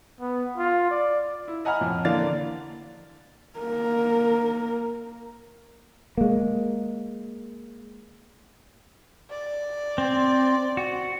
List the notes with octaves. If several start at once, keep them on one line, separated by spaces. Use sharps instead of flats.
B3
F4
D5
E4
D#5 F#5 G#5 A#5 B5 F6
F2 A2
D3 E3 A#3 D5 F5 A6
A#3 A#4
G#3 A#3
D5
C4
F#4